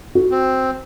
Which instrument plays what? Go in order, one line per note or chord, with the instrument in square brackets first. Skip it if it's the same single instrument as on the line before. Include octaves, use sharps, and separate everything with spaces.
[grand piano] F#4
[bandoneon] C4